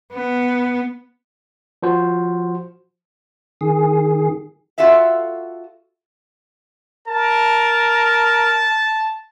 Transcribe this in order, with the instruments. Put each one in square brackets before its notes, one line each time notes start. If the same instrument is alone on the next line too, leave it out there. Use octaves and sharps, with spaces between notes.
[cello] B3
[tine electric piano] F3 F#4 C5
[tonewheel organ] D#3 G#4
[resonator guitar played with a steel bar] F4 F#4 A4 E5 F5
[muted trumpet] A#4 [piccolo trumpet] A5